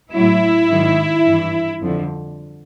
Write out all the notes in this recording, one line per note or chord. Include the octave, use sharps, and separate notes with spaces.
A2 F#3 E4
G#2 D#3 F#3
G2 E3
F2 D3 F3